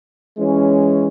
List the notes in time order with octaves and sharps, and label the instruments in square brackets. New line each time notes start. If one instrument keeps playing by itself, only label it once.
[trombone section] E3 G#3 C#4